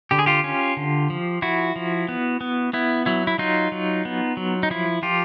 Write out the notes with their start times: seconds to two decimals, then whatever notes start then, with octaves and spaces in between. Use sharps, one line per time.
0.11 D3 G4
0.19 G#4
0.26 F4 G4
0.44 C#4
0.77 D3
1.10 F3
1.42 F3 E4 F#4
1.76 F3
2.08 B3
2.41 B3
2.73 B3 E4
3.06 F#3 E4
3.27 E4
3.38 F#3 D#4 F4
3.72 F#3
4.05 B3
4.37 F#3
4.63 D#4
4.70 F3 E4
5.02 F3 F4 G4